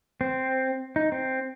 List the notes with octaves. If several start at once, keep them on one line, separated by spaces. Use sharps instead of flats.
C4
D#4
C4